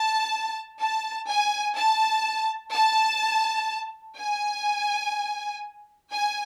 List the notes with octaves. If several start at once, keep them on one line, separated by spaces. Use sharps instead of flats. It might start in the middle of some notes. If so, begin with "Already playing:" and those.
Already playing: A5
A5
G#5
A5
A5
G#5
G#5